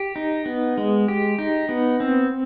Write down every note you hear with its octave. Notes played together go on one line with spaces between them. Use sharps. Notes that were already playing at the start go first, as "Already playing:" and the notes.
Already playing: G4
D#4
B3
G#3
G4
D#4
B3
C4